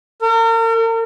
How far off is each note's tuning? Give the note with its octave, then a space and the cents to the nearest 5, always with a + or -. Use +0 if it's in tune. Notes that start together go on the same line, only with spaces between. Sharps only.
A#4 -40